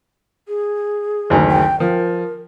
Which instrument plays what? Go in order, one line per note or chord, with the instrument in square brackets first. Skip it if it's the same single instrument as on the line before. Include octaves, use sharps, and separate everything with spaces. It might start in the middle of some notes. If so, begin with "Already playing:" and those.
[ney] G#4
[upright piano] F#1 D2 D#3
[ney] G5
[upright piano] F3 [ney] A#4